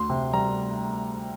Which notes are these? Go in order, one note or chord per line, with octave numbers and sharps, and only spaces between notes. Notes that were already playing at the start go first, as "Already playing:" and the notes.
Already playing: D2 C6
C3
G3 A#5